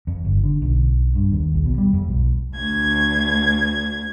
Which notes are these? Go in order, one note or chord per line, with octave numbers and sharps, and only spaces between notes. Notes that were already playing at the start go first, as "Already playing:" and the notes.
F2
G1
D3
B1
G2
D#2
A#1
B2
G3
F2
B1
D2 G#6